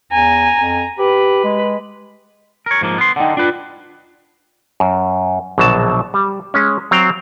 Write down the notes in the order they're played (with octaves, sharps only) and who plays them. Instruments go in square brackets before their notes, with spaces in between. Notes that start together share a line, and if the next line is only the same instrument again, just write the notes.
[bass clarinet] E2 [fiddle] G#5 A#5
[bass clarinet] F2
[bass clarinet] G4 [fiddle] B4
[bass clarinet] G#3
[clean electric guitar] A#4 C#5
G#2 F3 A#3
B3 C6
[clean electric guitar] D3 D#4 [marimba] F#5 G5
[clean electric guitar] D4 B4 [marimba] F4
[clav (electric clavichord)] F#2
A#1 B2 D3 F#3 A5
G3
G#3 C#4
F#3 C4 F5 G5